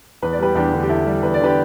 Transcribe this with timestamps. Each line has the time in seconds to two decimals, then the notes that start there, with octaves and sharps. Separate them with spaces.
0.22 E2 B4
0.32 D5
0.39 G3 G4 B4
0.55 E2 D4 G4
0.73 D3
0.83 G4
0.89 E2 E4 A4
1.06 G3
1.23 E2 B4
1.34 D5
1.41 D3 G4 B4